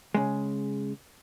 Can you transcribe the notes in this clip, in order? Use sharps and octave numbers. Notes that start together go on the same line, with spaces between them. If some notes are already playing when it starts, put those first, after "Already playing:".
C#3 G#3